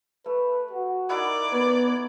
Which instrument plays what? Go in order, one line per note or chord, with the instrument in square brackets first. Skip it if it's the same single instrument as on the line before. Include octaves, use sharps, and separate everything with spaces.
[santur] A3 [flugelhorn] B4
[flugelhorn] F#4
[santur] D#4 E4 F#5 [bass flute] A#4 [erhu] D5
[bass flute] B3 [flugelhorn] B4 [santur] C#5